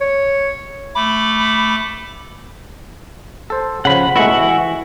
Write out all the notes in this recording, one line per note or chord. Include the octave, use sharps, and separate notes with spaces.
C#5
A3 B5 D6
A4 C5
C#3 F3 F#5 B5
G#3 A3 B3 E4 F#4 F#5
E3